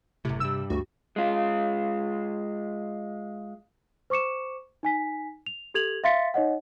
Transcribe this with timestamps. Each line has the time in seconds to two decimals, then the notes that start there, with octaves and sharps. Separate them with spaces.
0.25 F#1 A2 C3
0.40 G2 G3 E6
0.70 D2 F#4
1.16 G#3 F4
4.10 C5 C#6 D6 C#7 E7
4.83 D#4 G#5 B6
5.46 F7
5.74 G4 A4 G#6 F7 F#7
6.04 E5 F5 C6 A6 B6 C#7
6.34 D#4 C#5 D#5 F#5